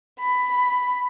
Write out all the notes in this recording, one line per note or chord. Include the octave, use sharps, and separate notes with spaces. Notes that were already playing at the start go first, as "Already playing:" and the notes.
B5